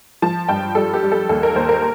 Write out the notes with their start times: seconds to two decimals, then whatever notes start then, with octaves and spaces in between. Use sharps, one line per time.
0.22 F3 A5
0.49 G2 G5
0.75 G3 A4
0.94 G4
1.03 G3
1.12 A4
1.29 D#2 A4
1.43 A#4
1.55 D#2 C5
1.69 A#4